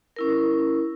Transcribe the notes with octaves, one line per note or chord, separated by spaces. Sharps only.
C#4 E4 A#4